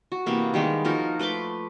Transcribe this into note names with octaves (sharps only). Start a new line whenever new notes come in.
F#4
C3 E3 A#3 B3
D#3 G3 G#3 B3
F3 D#4 F#4 A#4
A3 B4 C6 D6